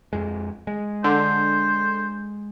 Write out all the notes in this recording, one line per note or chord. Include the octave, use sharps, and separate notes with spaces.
F2 G#3
G#3
D3 C5